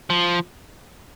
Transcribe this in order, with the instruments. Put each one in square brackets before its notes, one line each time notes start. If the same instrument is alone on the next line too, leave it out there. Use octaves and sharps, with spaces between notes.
[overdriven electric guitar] F3